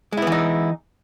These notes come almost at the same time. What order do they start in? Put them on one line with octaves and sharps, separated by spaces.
G#3 E4 B3 E3 D#4